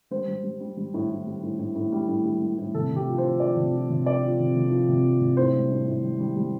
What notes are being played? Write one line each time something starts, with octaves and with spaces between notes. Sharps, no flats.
G3 C5
G3
G3
G3
G3
A2
A2
G3
A2
A2
A2
G3
A2
G3
G3
A2
C3 A4
C3
G4
F3
C5
F3
F3 D5
C3
F3
C3
F3 D5
F3
C3
C3
F3
C3
F3
C3
A2 C5
G3
A2
A2
G3
G3
G3